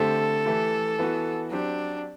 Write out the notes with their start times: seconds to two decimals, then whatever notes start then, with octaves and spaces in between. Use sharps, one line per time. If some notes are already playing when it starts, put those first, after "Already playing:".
Already playing: D3 A3 C4 G4 A4
0.45 E3 A3 E4 G4
0.98 E3 B3 F#4
1.51 F#3 C4 D4 G4